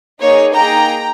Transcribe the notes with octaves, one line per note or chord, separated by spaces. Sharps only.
A#3 D#4 G#4 C#5
A#3 D#4 G#4 G5 A#5